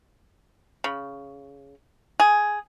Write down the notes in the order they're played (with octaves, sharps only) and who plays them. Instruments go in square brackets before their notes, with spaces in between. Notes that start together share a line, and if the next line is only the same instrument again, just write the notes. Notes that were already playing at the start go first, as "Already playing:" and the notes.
[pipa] C#3
G#4